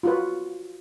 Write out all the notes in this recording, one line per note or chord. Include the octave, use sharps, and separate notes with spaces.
F4 F#4 B4